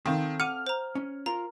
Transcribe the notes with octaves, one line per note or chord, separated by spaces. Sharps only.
D#3 C4 A4 F5
F#5 D6 F6 D#7
C5 A#5
C#4
F4 A#4 A#5